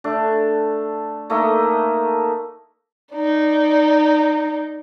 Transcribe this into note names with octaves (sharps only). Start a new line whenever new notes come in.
A3 D4
A3 A#3 D#4 D#5
D#4 D5